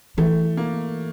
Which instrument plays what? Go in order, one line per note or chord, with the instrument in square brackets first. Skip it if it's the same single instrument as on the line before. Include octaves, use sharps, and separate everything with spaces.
[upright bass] E3 [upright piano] A3
[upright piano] A#3